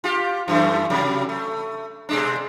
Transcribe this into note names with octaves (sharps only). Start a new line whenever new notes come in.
F4 G4
F#2 E3 A3
C3 F#3 G3
A3
B2 G#3 D4